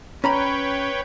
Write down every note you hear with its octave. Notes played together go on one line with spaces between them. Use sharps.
C#4 B4 C#5 G5 A#5 B5